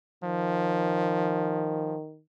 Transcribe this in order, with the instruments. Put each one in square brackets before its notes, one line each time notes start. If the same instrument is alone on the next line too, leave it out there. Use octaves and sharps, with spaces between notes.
[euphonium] D#3 [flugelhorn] F3